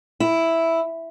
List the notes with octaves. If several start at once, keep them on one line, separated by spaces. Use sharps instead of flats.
E4